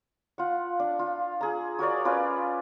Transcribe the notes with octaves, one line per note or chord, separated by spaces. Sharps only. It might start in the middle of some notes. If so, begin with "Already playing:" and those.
F4 F#5
D4
F4
G#4 A#5
F#4 A#4 C#5 D5
C#4 F4 B4 D5